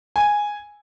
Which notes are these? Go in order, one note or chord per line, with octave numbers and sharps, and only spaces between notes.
G#5